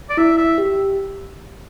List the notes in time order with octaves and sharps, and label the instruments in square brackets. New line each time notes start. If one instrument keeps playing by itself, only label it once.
[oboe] D5
[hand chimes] E4 [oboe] E5
[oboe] E5
[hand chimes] G4